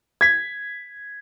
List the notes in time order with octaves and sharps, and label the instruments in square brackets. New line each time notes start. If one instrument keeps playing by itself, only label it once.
[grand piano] G#6 B6